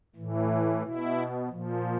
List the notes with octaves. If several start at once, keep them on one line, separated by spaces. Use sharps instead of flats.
A2 E3
B2 E4
A#2 F3